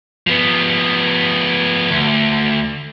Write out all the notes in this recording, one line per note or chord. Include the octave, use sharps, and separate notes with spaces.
F3 B3
D2